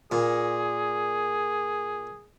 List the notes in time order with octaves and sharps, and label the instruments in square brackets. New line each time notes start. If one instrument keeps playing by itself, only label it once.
[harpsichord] A#2 [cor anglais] G#4